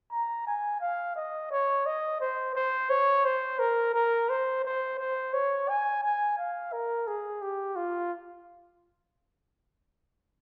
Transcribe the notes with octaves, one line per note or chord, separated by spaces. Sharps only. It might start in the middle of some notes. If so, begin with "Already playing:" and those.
A#5
G#5
F5
D#5
C#5
D#5
C5
C5
C#5
C5
A#4
A#4
C5
C5
C5
C#5
G#5
G#5
F5
A#4
G#4
G4
F4